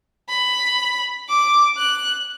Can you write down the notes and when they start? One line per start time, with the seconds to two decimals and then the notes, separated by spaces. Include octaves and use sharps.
0.29 B5
1.29 D6
1.78 F#6